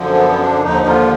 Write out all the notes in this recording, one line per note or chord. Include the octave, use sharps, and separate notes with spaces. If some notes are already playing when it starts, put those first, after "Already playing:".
Already playing: F#2 D3 F3
B3
B3
D4
D#2 D3 F3 D#4
F4